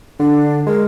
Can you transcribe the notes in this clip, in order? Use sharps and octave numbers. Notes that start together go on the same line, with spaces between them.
D3 D4
G#3 A#4